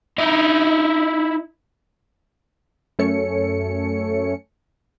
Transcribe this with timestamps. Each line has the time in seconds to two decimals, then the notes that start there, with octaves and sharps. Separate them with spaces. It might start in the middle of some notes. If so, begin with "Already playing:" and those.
0.18 D#4 E4
2.99 F#2 A3 C#4 A4 C#5 C#7